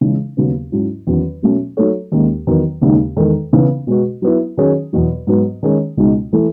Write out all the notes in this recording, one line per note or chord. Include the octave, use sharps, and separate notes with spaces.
C#3 E3 G#3
D#2 C#3 F#3 B3
G#2 F#3 C#4 E4
E2 D#3 F#3 C#4
B2 F#3 A3 C#4
F#3 A3 D#4 A4 C#5
D#2 D#3 G#3 C#4
E2 D#3 F#3 B3 D#4
D#2 C#3 G#3 D#4
E2 D#3 G#3 D#4 A4
C#3 E3 B3
B2 G#3 B3 F#4
F#3 B3 E4
D#3 F#3 C#4 G#4 C#5
E2 B2 F#3
G#2 F#3 B3
D#3 G#3 C#4 G#4 C#5
C#2 B2 G#3 D#4
E3 A3 E4 A4